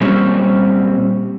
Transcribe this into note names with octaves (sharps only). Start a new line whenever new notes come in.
A#2 G3 C4 C#4